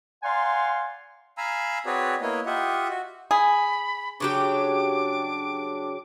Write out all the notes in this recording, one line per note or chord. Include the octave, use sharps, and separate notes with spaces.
D5 F5 F#5 G#5 A#5 C6
F5 G#5 A#5 B5 E6
C4 F#4 G#4 B4 C#5 D5
A#3 B3 E4 C#5 D#5
F4 G4 D#5 E5 F#5
F#4
G#4 B5
C#3 F#3 D4 G4 D6